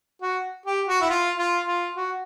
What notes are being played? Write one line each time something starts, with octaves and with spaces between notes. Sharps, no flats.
F#4
G4
F#4
E4
F4
F4
F4
F#4